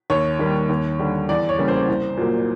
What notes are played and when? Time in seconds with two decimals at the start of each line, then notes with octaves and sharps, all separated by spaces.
0.10 D#2 C#5
0.39 D#3 G3 A#3
0.69 D#2
0.99 D3 G3
1.29 E2 D5
1.49 C#5
1.59 C#3 E3 G3 A#3
1.68 C5
1.88 C2
2.17 A#2 F#3 A#3